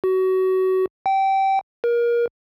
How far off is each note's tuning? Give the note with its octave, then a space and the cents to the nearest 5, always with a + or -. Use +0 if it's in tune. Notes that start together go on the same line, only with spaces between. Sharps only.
F#4 +25
G5 -20
A#4 +25